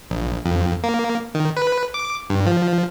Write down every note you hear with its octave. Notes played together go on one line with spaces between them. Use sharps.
A#1
F2
A#3
D#3
B4
D6
G2
F3